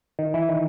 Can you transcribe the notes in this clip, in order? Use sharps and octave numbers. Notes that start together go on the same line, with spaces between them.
D#3
E3
D#3